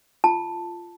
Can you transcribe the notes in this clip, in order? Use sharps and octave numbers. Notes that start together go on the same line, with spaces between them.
F4 A5